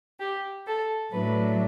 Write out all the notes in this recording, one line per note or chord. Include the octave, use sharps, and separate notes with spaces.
G4
A4
A2 F#3 A3 D4 B4